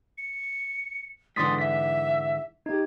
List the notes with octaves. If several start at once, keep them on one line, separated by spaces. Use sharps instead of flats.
C#7
G#2 D3 E3 C6 D#6 A6 B6
E5 B6
D#4 G4 G#6